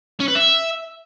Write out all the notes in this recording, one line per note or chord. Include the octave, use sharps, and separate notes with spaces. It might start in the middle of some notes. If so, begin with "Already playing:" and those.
C#4
B4
E5